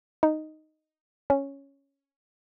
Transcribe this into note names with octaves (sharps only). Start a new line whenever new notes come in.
D#4
C#4